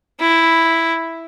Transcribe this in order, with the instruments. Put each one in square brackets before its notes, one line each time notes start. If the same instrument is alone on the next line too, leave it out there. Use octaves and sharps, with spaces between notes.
[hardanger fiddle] E4